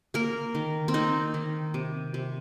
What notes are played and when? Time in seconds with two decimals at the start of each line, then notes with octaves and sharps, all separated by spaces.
0.14 A#3 A#4
0.55 D#3
0.88 C4
0.94 A#3 D#4
1.34 D#3
1.74 C3
2.14 C3